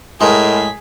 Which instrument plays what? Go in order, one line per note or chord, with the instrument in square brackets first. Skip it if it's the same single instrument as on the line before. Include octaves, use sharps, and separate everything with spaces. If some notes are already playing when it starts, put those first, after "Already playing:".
[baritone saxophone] A2 [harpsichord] G#3 [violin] G#4 B6 [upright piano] A#4 D#5 C6